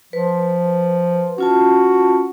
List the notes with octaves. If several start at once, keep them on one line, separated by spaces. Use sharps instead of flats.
F3 B4
C#4 F4 F#4 A5